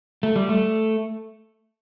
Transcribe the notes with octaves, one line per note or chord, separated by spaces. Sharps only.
A3
G3
A3